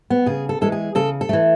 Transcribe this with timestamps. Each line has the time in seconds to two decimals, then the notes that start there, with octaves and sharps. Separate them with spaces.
0.10 B3
0.26 C#3 G#4
0.49 A4
0.61 E3 G#3 A4
0.72 G#4
0.95 C#3 A4
1.21 A4
1.29 E3 A3